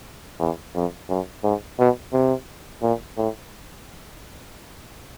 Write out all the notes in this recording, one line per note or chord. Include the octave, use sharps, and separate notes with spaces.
E2
F2
F#2
G#2
B2
C3
A#2
A2